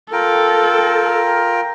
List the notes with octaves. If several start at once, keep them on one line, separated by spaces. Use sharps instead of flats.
F4 A4 A#4 G5